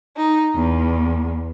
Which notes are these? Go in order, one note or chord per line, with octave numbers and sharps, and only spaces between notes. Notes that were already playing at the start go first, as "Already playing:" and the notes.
D#4
E2